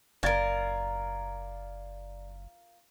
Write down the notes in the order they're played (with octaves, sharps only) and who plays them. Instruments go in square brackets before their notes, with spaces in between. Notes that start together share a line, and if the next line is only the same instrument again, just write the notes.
[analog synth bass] F#1 [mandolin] F4 A#4 [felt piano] D5 G#6 A6